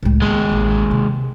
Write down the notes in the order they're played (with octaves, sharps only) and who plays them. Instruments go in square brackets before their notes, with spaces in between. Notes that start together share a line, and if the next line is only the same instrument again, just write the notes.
[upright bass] C#2 A2
[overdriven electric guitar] D#2 G#3 [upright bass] B3
[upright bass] A1
C3